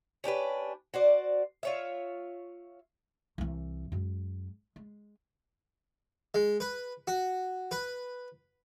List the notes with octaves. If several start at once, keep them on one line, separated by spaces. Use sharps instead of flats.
C#4 D4 G4 B4
F#4 C5 D5
F4 C#5 E5
C2 E3
F#2 G#3
G#3
G#3
B4
F#4
B4